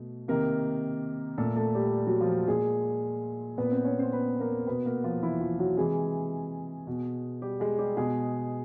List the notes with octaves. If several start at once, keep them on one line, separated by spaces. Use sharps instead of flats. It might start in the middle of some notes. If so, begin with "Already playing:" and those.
Already playing: B2 A3
C3 D#3 A#3 A#4
A#2 A3 A4
A3 A4
G3 G4
F#3 F#4
F3 F4
A#2 G#3 G#4
A#2 B3 B4
C4 C5
C#4 C#5
C4 C5
B3 B4
A#3 A#4
B2 B3 B4
A#3 A#4
F3 F4
E3 E4
F3 F4
F#3 F#4
C3 E3 G#3 G#4
B2
G3 G4
G#3 G#4
G3 G4
B2 G#3 G#4